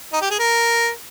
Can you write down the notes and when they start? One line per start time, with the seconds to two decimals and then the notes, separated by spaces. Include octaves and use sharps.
0.13 D#4
0.22 G4
0.30 G#4
0.39 A#4